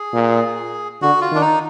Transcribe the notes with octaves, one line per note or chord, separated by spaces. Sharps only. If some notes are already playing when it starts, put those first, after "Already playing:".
Already playing: G#4
A#2
D3 F#4
F4
D#3 D4
D#4